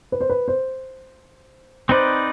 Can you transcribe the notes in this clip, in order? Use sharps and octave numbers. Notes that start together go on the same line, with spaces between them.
B4
C5
B4
C5
C4 D#4 B4 C5 D5